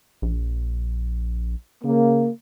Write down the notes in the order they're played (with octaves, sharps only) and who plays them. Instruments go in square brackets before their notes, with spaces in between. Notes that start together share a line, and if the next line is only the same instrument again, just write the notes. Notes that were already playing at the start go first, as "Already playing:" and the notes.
[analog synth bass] A#1
[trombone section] C#3 A#3